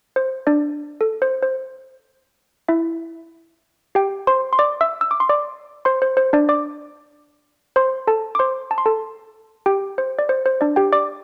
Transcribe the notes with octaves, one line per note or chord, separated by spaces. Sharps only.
C5
D4 D5
A4
C5
C5
E4 E5
G4 G5
C5 C6
C6
D5 D6
E5 E6
E6
D6
C6
D5 D6
C5 C6
C5
C5
D4 D5
D5 D6
C5 C6
A4 A5
D6
C5 C6
A5
C6
A4 A5
G4 G5
C5
D5
C5
C5
D4 D5
G4 G5
D5 D6